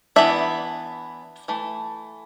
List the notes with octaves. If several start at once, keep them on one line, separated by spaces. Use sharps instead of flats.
E3 B3 D4 E5
E3 A3